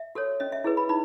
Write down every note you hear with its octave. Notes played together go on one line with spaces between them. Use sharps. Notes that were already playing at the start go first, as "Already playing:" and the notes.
Already playing: E5
F#4 A4 C#5
C#4 D#5
E5
E4 G#4 B4
B5
D#4 B5